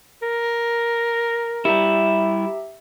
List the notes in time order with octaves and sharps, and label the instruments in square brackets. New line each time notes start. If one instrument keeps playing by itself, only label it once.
[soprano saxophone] A#4
[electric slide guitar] G3 E4 [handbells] G4 E5 A#5